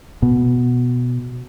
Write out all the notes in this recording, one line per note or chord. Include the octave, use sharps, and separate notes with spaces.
B2